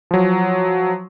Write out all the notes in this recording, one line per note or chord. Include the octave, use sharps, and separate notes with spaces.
F3 F#3